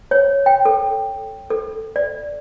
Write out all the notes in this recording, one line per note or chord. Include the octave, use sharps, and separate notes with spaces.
C#5
G5
A4
A4
D5